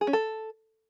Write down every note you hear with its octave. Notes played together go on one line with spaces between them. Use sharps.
G#4
C#4
A4